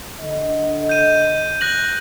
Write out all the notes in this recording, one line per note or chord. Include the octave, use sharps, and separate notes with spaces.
D3 D#5
G6 D#7
F#6 A#6 F#7